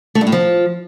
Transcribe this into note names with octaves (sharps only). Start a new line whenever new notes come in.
A3
G2
A2
F3